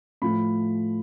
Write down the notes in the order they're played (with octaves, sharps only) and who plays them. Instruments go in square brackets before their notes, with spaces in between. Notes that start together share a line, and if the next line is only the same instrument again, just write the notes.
[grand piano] A2 F3 A3 B5